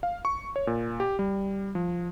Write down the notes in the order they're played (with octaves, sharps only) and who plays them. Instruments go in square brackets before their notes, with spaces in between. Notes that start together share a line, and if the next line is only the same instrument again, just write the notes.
[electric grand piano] F5
C#6
C#5
A#2
G4
G3
F3